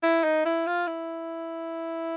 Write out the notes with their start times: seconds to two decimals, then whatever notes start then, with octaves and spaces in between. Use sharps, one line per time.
0.03 E4
0.24 D#4
0.45 E4
0.67 F4
0.87 E4